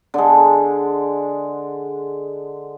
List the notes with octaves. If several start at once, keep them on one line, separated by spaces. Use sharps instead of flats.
D3 G#3